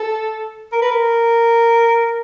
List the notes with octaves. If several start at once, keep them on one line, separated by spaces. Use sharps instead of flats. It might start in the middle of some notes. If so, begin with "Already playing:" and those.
Already playing: A4
A#4
B4
A#4